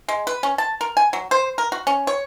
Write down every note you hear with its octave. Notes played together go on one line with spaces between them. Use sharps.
G#3
B4
C#4
A5
A#4
G#5
F#3
C5
A#4
F#4
C#4
C#5